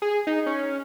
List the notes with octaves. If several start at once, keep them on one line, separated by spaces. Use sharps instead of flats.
G#4
D#4
C#4